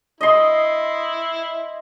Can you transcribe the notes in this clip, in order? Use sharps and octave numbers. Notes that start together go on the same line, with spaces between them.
E4 D#5 C6